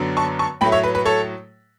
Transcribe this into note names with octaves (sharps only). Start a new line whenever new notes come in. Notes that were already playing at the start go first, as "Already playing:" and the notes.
Already playing: F#2 D3 F#3 B3 D4
A5 C#6
A5 C#6
A2 F#3 A3 G5 B5
C#5 E5
B4
B4
A4 C#5